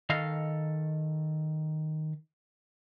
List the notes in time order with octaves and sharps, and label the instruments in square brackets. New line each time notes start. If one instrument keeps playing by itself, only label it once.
[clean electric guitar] D#3 A4 D#5 F5